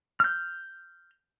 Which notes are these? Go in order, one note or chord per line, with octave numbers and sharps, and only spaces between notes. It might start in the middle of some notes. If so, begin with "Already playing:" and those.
F6 G6